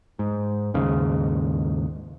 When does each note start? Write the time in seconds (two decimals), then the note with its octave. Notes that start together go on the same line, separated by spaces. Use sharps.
0.19 G#2
0.74 D#2 G#2 C#3